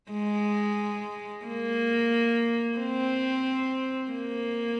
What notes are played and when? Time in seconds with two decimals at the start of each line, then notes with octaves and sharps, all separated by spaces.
0.11 G#3
1.46 A#3
2.78 C4
4.11 A#3